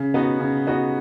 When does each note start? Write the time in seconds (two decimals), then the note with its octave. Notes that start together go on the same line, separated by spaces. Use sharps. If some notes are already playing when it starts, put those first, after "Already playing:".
Already playing: C#3
0.14 B3 D#4 F#4
0.40 C#3
0.67 B3 D#4 F#4